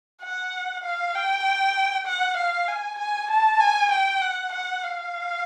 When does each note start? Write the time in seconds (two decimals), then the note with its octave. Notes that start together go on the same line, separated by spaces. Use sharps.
0.22 F#5
0.84 F5
1.15 G5
2.07 F#5
2.37 F5
2.68 G#5
2.99 G#5
3.30 A5
3.60 G#5
3.91 G5
4.21 F#5
4.52 F#5
4.83 F5